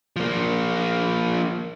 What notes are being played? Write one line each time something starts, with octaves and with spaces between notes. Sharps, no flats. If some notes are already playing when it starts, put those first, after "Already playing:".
F3 A#3